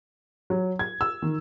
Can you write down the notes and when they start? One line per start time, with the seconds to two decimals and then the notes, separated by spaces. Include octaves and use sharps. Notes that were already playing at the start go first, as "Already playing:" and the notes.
0.50 F#3
0.79 G#6
1.01 E6
1.22 D#3